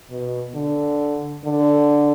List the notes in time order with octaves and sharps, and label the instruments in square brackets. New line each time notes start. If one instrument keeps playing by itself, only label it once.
[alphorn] B2
D3
D3